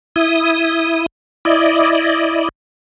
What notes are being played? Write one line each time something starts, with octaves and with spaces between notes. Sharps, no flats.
E4 D#6
E4 D5 D#5